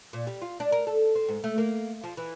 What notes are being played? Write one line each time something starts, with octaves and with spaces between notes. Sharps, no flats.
A#2
G3
F4
D4
A#4
A4
C4
G#2
A3
A#3
F3
E3